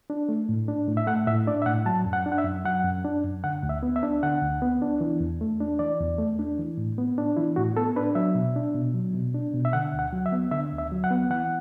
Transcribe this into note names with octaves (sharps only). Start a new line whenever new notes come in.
D4
A3
A2
D4
A2
E5
A3 F#5
A2 E5
D4 D5
E5
A2 F#5
F#3 A5
F#2
F#5
D4
F#5
E5
F#2
F#3 F#5
F#2
D4
F#2
D3 F#5
D2
E5
B3
E5
D4
D3 F#5
D2
B3
D4
E3
E2
A3
D4
E3 D5
E2
A3
D4
E3
A2
B3
D4
E3 E4
A2 F#4
B3 A4
D4 B4
F#3 E5
B2
D4
B2
F#3
B2
D4
B2
E5
D3 F#5
D2
F#5
F#3
E5
B3
D3 E5
D2
E5
F#3
F#5
B3
E3 F#5